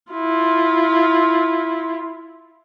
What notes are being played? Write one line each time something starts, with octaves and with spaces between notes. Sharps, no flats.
E4 F4